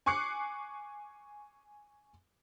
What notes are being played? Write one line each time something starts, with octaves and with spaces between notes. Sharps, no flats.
G#5 C#6 D6 F#6 C7 C#7